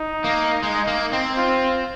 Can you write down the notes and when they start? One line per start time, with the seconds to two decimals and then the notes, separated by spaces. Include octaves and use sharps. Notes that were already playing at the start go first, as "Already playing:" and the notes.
Already playing: D#4
0.24 A#3
0.63 G#3
0.87 A#3
1.13 C4
1.37 F4